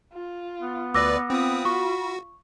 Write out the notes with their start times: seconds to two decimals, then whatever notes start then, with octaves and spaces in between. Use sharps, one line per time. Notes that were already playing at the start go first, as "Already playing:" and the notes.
0.13 F4
0.62 B3
0.94 D2 B4 D5 D6 E6 A#6
1.30 C4 F4 B5 D#6
1.65 F#4 C#6